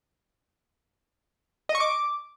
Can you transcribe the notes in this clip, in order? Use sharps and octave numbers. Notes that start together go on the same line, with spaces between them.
D#5
C#6
D6